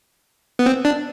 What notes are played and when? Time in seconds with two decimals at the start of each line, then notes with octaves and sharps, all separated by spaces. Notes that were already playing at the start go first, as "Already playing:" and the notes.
0.59 B3
0.66 C4
0.85 D4